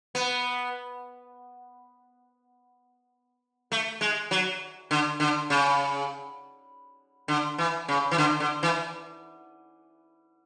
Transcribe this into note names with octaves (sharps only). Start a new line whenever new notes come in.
B3
A3
G#3
F#3
D3
D3
C#3
D3
E3
C#3
E3
D3
D3
E3